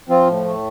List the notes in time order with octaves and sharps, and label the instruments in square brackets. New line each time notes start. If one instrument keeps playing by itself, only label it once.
[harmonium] F3 C4 F4
A2
A3